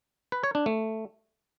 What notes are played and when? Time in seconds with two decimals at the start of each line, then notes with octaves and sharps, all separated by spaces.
0.32 B4
0.44 C#5
0.55 D4
0.66 A3